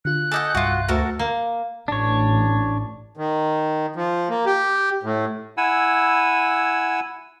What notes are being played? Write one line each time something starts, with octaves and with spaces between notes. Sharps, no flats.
D3 F4 F#6
A4 D#5 F#5 G#5 D6 G6
C2 G2 F4 F#4 E5
D2 F#4 A4 A#4
A#3
A1 D4 C#5
D#3
F3
A#3
G4
A2
E4 F#5 G#5 E6